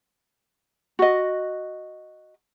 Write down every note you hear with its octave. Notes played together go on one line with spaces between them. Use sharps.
F#4 D#5